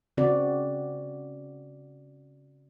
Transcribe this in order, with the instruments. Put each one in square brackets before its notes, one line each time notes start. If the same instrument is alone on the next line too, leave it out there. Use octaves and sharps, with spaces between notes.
[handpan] C#3 C4 F#4 D5